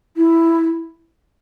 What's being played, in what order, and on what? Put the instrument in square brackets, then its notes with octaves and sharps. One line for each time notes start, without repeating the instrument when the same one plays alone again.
[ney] E4